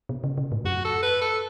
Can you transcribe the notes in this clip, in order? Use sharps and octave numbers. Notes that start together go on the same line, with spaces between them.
B2
C#3
C#3
A2
F#2 F#4
A4
B4
A4